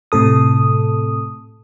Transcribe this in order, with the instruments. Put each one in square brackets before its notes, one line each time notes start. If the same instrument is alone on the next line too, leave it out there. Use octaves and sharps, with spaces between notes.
[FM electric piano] A2 C3 A4 D#6